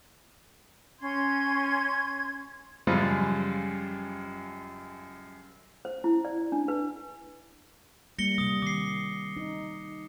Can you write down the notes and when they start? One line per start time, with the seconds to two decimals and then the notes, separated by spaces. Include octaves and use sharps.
1.00 C#4 C6 G#6
2.87 F#2 C#3 F3 G3 G#3 F4
5.85 C5
6.04 E4
6.25 D5
6.52 D4
6.68 B4
8.19 G3 A#3 A#6 C#7 G7
8.38 C3 G3 D#6
8.62 D#3 D6 C7
9.37 D#4